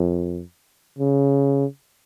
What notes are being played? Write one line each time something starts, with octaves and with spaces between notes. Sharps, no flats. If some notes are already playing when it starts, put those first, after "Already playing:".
Already playing: F2
C#3